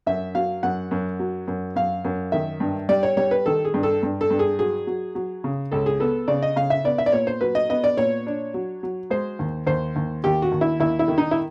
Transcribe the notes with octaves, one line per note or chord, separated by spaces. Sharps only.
F#2 E5
F#3 F5
F#2 F#5
F#2
F#3
F#2
F#2 F5
F#2
D#3 E5
G2
G3 D5
C#5
G3 C#5
B4
D#3 A4
G#4
G2
A4
G2
A4
G2
G#4
F#3 G#4
F#3
F#3
C#3
C#2 A4
G#4
B3 A4
C#3 D5
D#5
C#3 F5
E5
B3 D5
E5
D5
A#2 C#5
C5
F#3 B4
D#5
B3 D#5
D5
A#2 C#5
D4
F#3
F#3
G#3 C5
D#2
D#2 C5
D#2
D#2 G4
F#4
D#2
E4
D#2 E4
E4
D#3
D#4
E4